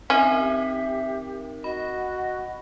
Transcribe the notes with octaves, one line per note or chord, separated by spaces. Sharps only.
C4 C#4 D#4 A#4 D#5 E5
G4
F#4 D#5 B5